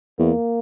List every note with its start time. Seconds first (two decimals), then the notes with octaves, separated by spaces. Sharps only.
0.19 E2 A#3